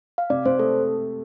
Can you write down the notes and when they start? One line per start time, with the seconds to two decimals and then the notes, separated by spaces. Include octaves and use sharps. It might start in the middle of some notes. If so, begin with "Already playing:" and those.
0.18 F5
0.30 C3 D5
0.46 C3 C5
0.59 A3 A4